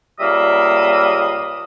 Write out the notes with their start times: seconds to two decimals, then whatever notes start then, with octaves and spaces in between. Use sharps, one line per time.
0.20 C#2 G3 A#3 E5 D#6